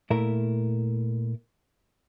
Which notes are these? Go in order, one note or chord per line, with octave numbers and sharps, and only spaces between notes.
A#2 A3 E4 A#4